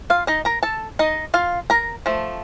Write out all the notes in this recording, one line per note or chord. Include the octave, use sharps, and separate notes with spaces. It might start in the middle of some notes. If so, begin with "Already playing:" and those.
F4 F5
D#4 D#5
A#4 A#5
A4 A5
D#4 D#5
F4 F5
A#4 A#5
F3 A3